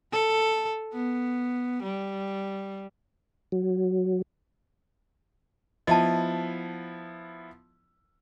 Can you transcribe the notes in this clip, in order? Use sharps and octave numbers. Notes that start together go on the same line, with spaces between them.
A4
B3
G3
F#3
F3 B3 E4 D#5 A5